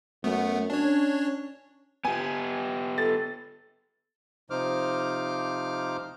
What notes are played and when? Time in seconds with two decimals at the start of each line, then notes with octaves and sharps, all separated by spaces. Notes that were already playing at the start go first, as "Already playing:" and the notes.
0.24 F#2 A3 B3
0.70 C#4 D4 C#5
2.05 B3 G4 G#5
2.98 A4 A6
4.50 C3 F3 D#4 C5 D6 F6